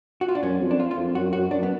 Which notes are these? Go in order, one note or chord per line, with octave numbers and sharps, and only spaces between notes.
F#4
F4
D4
F#2 C#4
F2
D4
F4
F4
F2
F#2 F#4
F#2 F#4
F#2 D4
B3